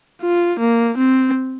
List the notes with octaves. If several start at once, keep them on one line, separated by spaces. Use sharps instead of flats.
F4
A#3
C4